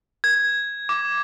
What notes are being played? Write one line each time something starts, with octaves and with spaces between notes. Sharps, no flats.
G#6
D6